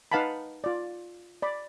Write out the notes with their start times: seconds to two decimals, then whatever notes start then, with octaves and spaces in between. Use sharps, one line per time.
0.12 D#4 B4 F5 F#5 A5 B5
0.64 F4 D5
1.42 D5 B5